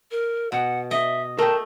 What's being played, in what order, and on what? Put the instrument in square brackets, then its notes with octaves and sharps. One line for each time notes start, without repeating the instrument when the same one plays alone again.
[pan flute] A#4
[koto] B2 [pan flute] F#5
[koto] D#5 [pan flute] E5
[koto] A3 [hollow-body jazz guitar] A#4 G5 [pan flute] A5